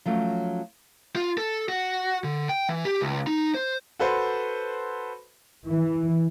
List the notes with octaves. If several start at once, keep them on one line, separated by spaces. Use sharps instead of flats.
F3 F#3 A3 C#4
F4
A4
F#4
D3
G5
E3
G4
C#2
D#4
C5
F#4 A4 B4 C5
E3